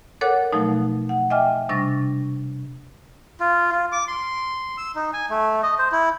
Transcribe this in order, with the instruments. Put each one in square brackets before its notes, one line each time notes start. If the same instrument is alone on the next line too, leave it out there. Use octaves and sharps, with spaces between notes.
[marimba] A4 A#4 C#5 F#5 D6 F#6
B2 F3 F#3 A3 D#4
F#5
D#5 E5 G5 G#5 D6 F6
C3 G3 D4 C#6 A6 A#6
[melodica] F4
F4
D6
C6
E6
D#4
G#5
A3
D#5
C5
E4